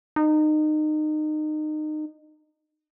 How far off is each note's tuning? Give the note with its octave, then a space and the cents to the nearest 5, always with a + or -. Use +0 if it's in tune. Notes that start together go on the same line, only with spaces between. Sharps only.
D#4 -25